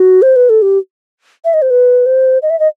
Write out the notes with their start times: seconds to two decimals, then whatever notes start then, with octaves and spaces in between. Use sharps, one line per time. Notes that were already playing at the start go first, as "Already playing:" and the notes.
Already playing: F#4
0.22 C5
0.36 B4
0.50 A4
0.62 G4
1.45 E5
1.54 D#5
1.62 C5
1.70 B4
2.06 C5
2.42 D#5
2.50 E5
2.60 D#5